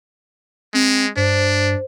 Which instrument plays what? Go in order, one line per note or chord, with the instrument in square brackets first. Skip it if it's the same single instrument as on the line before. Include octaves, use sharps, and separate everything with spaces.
[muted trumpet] G#3 [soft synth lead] C4
[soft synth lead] G2 [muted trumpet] D4 [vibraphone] C5